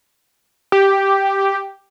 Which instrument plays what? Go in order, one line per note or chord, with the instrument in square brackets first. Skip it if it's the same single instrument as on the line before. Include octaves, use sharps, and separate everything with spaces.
[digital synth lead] G4